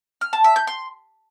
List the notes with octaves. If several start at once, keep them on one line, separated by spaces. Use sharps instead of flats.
F6
A5
E5
G6
C6